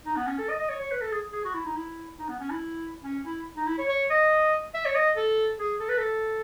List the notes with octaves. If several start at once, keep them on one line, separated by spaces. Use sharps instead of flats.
D#4
B3
C#4
A4
D#5
D#5
C#5
C#5
B4
A4
G#4
G#4
F#4
E4
D#4
E4
D#4
B3
C#4
E4
C#4
E4
D#4
E4
C#5
C#5
D#5
E5
C#5
D#5
A4
G#4
A4
B4
A4